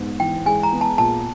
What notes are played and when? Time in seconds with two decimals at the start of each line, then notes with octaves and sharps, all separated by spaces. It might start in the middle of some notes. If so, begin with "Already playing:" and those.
Already playing: G#2 B3
0.20 E3 G5
0.46 G#3 G#5
0.63 A#5
0.72 B3
0.81 A5
0.98 A#2 A5